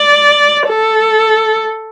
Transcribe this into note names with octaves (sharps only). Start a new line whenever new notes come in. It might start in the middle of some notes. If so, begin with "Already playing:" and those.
Already playing: D5
A4